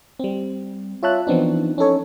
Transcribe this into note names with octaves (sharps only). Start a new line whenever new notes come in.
G3 C4
F4 C#5 E5 A5 F#6
E3 F3 B3 C4 D4 D#4
C#4 D#4 A4 C#5